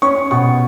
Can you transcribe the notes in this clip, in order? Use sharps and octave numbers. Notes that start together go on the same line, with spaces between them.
C#4 C#6
B2 C#6